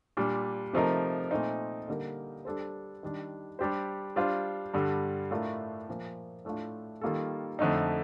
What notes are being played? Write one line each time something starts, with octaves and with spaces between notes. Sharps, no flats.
A#2 G3 D4
C3 F3 A3 D#4 A#4
A#2 A3 C4 D#4
D3 G3 A#3 D#4 A#4
G3 D4 A4 C5
D#3 G3 D4
G3 D4 G4 C5
G3 D4 F4 C5
G2 D3 G3
A2 A3 D4 F4 A#4
A#2 F3 A#3
A2 A3 D4 F4
D#3 G3 A#3 F4 A4
F2 D3 A3 D#4